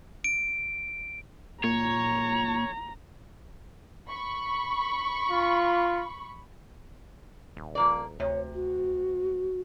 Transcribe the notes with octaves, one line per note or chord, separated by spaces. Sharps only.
D7
A#2 C#5 A#5
B5 C#6
F4
D#1
F3 A#3 D5
D2 C3 C#5
F#4